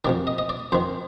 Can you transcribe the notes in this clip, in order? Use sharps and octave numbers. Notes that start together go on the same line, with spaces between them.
F2 C3 D#3 D5
D#5
D#5
D5
F2 D#3 C5